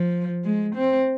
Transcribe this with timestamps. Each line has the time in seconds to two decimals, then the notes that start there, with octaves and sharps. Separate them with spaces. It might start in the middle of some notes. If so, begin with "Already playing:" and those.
Already playing: F3
0.44 G#3
0.75 C4